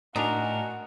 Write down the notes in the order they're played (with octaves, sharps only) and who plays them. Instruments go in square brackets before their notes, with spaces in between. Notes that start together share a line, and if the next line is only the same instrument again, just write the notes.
[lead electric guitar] A2 A#4 [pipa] D4 D#4 [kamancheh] F#4 [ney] G#5